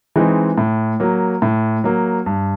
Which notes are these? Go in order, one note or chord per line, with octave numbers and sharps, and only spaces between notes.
E3 G#3 C4 D#4
A2
F#3 A#3
A2
F#3 A#3
G2